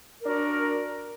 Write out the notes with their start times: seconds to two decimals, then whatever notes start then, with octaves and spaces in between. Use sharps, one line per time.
0.21 A#4
0.24 D4
0.28 F#4